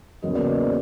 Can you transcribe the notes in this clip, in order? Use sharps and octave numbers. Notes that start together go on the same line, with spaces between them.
E2 C#3 F#3 A#3 D#5
D5
C#5
C5